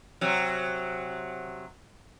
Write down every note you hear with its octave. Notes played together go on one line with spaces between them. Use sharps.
C3 F#3